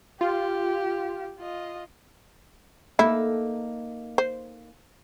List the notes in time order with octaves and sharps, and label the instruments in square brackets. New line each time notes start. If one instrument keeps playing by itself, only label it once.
[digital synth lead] F4 [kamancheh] G4
[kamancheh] F4 D#5
[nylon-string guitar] A#3 D#4 A4 [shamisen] E4
[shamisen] C5